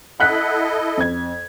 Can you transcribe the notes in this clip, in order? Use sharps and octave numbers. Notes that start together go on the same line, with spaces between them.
E4 A4 D#5 F#5 F#6 B6
F2 G#6